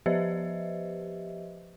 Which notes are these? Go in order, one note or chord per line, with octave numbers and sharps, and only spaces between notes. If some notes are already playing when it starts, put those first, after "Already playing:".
F3 G4 B4 C5 D#5 E5